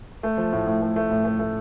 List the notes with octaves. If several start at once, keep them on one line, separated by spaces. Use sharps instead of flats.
A3
F3
A2
A2
A3
A3
A2
A3
A3